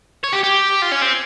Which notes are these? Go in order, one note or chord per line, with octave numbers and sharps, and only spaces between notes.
C#5
G4
G4
F4
C#4
C4